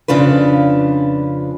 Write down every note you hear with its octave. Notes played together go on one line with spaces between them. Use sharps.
F2 C#3 D4 F4 B4